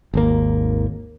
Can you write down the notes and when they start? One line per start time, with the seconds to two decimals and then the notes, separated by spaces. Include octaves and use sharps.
0.14 G#1 D#2 A#3